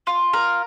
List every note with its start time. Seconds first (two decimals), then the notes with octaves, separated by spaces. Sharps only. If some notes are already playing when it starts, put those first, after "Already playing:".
0.07 F4
0.33 A#4